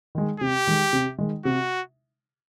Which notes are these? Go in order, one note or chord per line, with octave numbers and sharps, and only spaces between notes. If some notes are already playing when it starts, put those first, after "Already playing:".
D#3 G#3
C3 G4
D#3 G#3
C3
D#3 G#3
C3 F#4